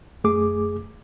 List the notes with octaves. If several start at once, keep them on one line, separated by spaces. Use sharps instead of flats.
F#2 A3 G#4 D6